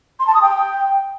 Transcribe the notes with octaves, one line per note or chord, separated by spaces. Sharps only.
C6
A5
D#6
G5